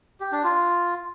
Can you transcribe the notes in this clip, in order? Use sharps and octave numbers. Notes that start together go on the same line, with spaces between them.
G4
D4
F4